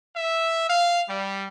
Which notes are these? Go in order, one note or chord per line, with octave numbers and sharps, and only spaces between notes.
E5
F5
G3